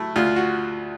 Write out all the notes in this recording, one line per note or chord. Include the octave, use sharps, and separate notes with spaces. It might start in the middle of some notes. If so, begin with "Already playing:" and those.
Already playing: F#3 A3 E4
D2 F4
F#4